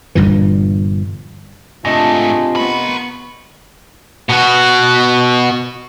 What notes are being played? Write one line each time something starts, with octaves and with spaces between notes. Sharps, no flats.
G1 G2 A#2 E3
G#2 C3 A3 D4 F4 G#4 D#5 A#6
B3 A#4 B5 C#6
B2 F#4